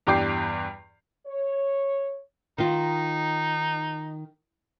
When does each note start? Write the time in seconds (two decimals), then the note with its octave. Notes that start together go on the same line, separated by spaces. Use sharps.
0.07 E2 G2 G3 G5 D6 C7
1.27 C#5
2.58 D#3 D#4 F4